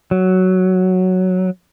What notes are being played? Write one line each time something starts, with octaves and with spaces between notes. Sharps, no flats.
F#3